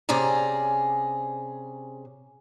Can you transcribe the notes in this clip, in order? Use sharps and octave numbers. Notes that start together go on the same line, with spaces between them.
C3 C#4 G#4 D5 A#5